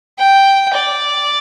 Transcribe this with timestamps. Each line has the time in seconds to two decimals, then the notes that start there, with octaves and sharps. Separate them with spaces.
0.19 G5
0.73 D5